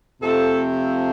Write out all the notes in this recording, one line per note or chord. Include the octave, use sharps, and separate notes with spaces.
F2 C3 F3 A3 C4 A4